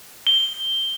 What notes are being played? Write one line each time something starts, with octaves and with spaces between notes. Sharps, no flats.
G7